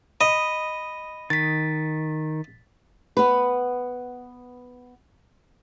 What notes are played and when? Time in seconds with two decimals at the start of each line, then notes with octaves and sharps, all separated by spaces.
0.21 D#5 B5
1.30 D#3 A6 B6
3.17 B3 B4